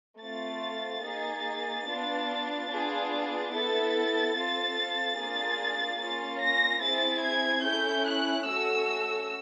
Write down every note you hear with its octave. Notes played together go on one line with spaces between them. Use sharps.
A3 C4 F4 A6
A#3 D#4 G#4
B3 D4 F4
B3 D4 F4 G#4
B3 E4 A4 A6
C4 F4 A4
A#3 D4 F4 G#4
A#3 C#4 F4 A6
A#6
C4 E4 G#4 A6
G#6
C#4 E4 A4 G6
F#6
A3 C#4 F#4 A4 E6